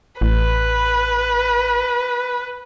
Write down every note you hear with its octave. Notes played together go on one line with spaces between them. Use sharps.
A1 B4